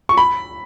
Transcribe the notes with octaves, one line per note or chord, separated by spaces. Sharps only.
C#6
B5